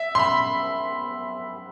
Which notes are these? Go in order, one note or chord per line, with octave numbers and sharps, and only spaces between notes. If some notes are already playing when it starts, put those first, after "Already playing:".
Already playing: E5
C6
B5